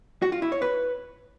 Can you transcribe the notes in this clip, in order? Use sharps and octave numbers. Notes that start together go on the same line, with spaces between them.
F#4
F4
E4
C#5
B4